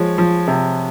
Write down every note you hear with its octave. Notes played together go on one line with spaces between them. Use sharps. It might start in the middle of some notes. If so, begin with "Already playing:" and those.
Already playing: F3 G#3 C#5
F3
C3